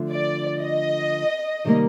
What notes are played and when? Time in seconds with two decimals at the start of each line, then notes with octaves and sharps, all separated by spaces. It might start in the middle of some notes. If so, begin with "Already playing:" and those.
Already playing: D3 F3 A3
0.11 D5
0.62 D#5
1.65 C3 D#3 G3 A#3